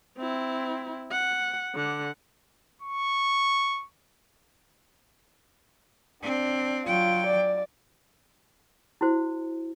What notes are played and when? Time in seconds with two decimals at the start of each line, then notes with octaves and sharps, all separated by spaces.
0.18 C4 E4
1.12 F#5
1.75 D3 F#5
2.82 C#6
6.23 C4 D4
6.87 F#3 F4 G5
7.26 D5
9.01 E4 F#4 C5